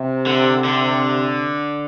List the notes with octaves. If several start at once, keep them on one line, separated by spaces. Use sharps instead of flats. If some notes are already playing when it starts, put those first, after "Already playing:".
Already playing: C3
D3
D3